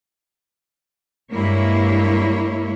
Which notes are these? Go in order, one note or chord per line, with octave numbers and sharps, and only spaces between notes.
G2 G#3 A#3 E4 C#5